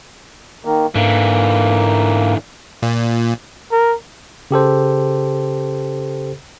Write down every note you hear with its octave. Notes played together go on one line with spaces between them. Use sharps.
D#3 A#3
G#2 D3 E3 A#3
A#2
A#4
C#3 G4 A4 C5